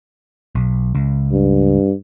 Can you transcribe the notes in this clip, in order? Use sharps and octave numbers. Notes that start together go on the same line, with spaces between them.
B1
C#2
G2